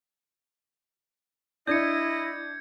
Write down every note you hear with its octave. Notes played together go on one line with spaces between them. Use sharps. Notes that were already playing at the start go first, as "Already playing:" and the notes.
D4 E4 D#5 G6 G#6 C#7